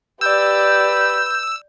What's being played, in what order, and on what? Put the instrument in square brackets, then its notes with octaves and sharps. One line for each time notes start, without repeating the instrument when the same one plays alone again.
[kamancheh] G4 D5 [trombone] B4 [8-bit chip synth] E6 [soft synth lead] G6